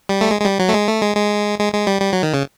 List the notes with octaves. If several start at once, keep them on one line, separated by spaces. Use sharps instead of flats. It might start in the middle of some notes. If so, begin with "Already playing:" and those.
G3
A3
G#3
G#3
G3
F#3
A3
G#3
A3
G#3
G#3
G#3
G#3
G3
G3
F#3
D#3
C#3